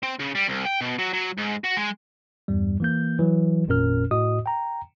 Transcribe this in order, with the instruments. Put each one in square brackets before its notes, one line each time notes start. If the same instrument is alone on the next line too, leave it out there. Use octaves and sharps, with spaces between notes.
[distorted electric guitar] C4
C#3
G3
C2
G5
B2
F#3
F#3
G#2
F#4
G#3
[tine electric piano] E2 G2 G3
E3 A#3 G6
E3 F#3
G#1 F2 A#2 C#4 A#4 F6
A2 F#4 D#5 D#6
G5 A#5